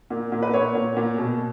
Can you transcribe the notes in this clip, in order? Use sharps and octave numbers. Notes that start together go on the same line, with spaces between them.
A#2
A#2
B4
A#2 C#5
A#2
A#2
B2